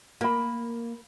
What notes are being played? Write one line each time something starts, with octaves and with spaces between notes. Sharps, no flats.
A#3 A#4 B5